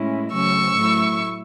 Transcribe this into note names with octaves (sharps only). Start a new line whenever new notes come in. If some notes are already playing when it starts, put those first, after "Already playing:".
Already playing: A2 G#3 C#4 E4
C#3 F#3 A3 C#4 C#6 E6
A2 F#3 A3 E4